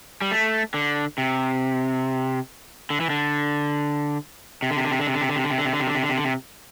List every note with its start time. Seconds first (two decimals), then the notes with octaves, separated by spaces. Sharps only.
0.21 G3
0.31 A3
0.74 D3
1.18 C3
2.90 D3
3.00 E3
3.10 D3
4.62 C3
4.71 D3
4.77 C3
4.85 D3
4.91 C3
4.99 D3
5.07 C3
5.14 D3
5.21 C3
5.29 D3
5.36 C3
5.44 D3
5.51 C3
5.58 D3
5.65 C3
5.73 D3
5.80 C3
5.87 D3
5.95 C3
6.02 D3
6.09 C3
6.16 D3
6.24 C3